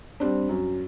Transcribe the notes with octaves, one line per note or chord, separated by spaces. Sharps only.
G3 C4 D4
F#2